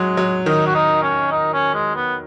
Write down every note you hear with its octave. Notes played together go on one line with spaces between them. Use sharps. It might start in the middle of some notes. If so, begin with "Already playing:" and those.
Already playing: F#3 G#3
F#3
D#3 D#4
F#4
D#4
C#4
D#4
C#4
G#3
B3